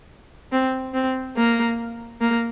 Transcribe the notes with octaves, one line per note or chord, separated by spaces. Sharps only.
C4
C4
A#3
A#3